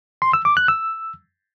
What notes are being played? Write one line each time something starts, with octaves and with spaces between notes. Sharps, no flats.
C6
E6
D6
F#6
E6